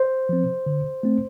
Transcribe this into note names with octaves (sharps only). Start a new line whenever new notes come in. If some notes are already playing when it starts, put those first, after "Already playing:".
Already playing: C5
F3 C4
D3
A3 C4